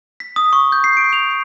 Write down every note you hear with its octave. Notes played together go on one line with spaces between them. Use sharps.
B6
D#6
C#6
G6
C7
D7
F7